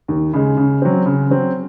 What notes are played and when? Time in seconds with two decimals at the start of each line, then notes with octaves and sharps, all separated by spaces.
0.08 D#2
0.33 C#3 G#3
0.57 C#3
0.82 F#3 C4
1.06 C#3
1.30 F#3 C4